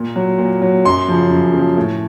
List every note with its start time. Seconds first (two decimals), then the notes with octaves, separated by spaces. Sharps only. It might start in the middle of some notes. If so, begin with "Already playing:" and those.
Already playing: A#2
0.16 F#3
0.38 A#2
0.62 F#3
0.85 F#2 C6
1.08 C#3 F3
1.30 F#2
1.53 C#3 F3
1.77 A2